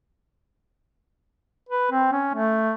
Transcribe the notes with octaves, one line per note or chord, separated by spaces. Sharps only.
B4
C4
C#4
A3